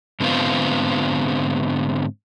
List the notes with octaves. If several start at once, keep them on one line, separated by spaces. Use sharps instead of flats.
G#2 D3 A3 B3 C4 F4